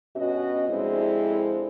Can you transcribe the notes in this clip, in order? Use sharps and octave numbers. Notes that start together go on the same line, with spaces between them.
G2 B2 C#4 F#4 D#5
F2 C3 G#3 C4 D4 E4